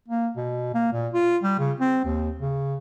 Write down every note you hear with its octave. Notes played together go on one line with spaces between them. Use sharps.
A#3
B2
A#3
A#2
F4
G3
C#3
C4
D#2
C#3